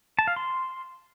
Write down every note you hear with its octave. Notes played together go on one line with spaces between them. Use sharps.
A5
F5
C6